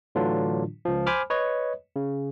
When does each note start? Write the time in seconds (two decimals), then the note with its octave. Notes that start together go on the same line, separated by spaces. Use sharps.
0.15 A2 D3 E3 F#3 D4 F4
0.85 C#2 F3
1.07 C5 G#5 B5 D6 F6
1.30 B4 C#5 D#5
1.96 C#3